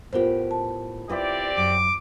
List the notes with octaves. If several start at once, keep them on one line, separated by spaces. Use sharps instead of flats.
A2 B3 F4 G4 A#4 C5
A5
C4 E4 F4 G4 B4 D5
F#2 D6